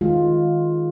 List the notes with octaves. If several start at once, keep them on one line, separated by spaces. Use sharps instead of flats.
D#3 G#3 F4